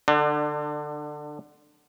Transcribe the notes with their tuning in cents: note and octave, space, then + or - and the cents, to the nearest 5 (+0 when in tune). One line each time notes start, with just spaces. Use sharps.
D3 +20 D4 +40